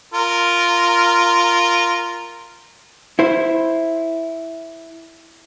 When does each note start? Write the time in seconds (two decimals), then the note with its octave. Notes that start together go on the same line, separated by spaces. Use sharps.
0.14 F4 A#4
3.19 E4 C5